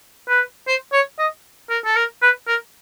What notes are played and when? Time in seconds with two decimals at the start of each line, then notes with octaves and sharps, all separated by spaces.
0.29 B4
0.67 C5
0.93 C#5
1.19 D#5
1.70 A#4
1.85 A4
1.96 A#4
2.22 B4
2.47 A#4